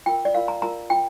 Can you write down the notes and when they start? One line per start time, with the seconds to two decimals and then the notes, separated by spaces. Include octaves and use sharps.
0.06 F4 A#4 G5
0.25 D5
0.34 F4 A#4 F5
0.48 A#5
0.62 F4 A#4 A#5
0.90 F4 G5